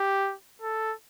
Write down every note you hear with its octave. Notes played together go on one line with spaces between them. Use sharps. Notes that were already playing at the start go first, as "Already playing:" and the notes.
Already playing: G4
A4